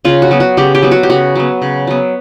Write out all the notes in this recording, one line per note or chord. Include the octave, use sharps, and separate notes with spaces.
C#3 F4
F#4
F#3 B3
F#4
C#3 G4
G4
F#3 B3
F#4
G4
C#3 F#4
F#3 B3
C#3
F#3 B3